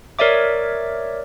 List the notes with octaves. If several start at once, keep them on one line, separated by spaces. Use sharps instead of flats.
A#4 C#5 D5 E5 D6